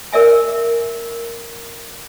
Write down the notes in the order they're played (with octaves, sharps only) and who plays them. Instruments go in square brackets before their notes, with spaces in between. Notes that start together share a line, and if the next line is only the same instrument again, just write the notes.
[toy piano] A#4 D5 E5 G#5